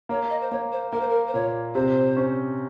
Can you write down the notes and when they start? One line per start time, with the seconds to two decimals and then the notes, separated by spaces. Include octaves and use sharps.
0.09 A#3 C#5
0.30 D#5
0.41 C5
0.51 A#3 C#5
0.72 C5
0.92 A#3 A#4
1.00 C5
1.09 A#4
1.27 C5
1.34 A#2 C#5
1.75 C3 C5
2.17 C#4